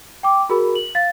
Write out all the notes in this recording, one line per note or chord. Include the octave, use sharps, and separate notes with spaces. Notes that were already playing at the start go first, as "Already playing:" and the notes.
G5 D6
F#4 G#4 A#4 B5
F#7
F5 A6